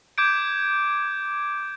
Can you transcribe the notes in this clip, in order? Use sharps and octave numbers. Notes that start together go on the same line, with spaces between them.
D6 G6 G#6 D7